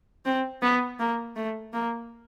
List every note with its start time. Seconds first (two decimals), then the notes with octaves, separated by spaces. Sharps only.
0.25 C4
0.62 B3
0.99 A#3
1.36 A3
1.73 A#3